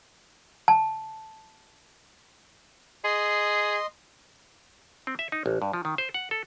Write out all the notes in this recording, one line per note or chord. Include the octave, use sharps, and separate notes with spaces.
A5
G#4 D#5 C6
C4
E5
D#4
A1
G2
F3
D#3
C5
F#5
A4